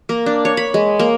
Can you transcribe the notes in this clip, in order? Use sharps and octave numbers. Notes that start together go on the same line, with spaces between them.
A#3
D4
C#5
B5
G#3
A#3